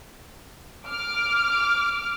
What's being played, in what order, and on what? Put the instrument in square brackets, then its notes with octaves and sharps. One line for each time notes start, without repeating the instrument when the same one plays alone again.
[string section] D6 F6